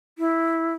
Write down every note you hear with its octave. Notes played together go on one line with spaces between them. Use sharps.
E4